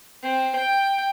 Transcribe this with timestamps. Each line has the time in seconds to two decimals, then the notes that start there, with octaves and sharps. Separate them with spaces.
0.23 C4
0.55 G5